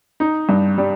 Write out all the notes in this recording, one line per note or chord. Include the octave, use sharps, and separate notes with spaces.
D#4
G2
G3